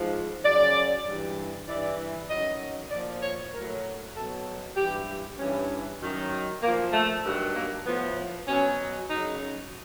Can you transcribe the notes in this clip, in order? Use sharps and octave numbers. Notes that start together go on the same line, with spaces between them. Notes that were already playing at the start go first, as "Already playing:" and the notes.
Already playing: G#2 F3
F#2 C#3 F#3 D5
G2
E3
G2 E3 D5
F#2 D#3 F#3 D#5
A#2 F3 D5
C#5
A2 F#3 A#4
B2 F#3 A4
G2 E3 G4
G2 E3 C#4
F#2 D#3 F#3
A#2 F3 A#3
A3
G2 D#3 F#3
A#3
A2 F3 B3
B2 F#3 C#4
F#2 C#3 F#3 D#4